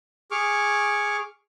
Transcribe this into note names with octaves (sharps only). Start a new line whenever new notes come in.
G#4 C#6 D6 F6